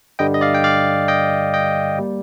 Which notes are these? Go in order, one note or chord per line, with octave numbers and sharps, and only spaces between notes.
G2 D3 G3 D#5 G5
D#5
D5 F5
G5
D5 F5
D#5 G5
D#5 G5
G3 A#3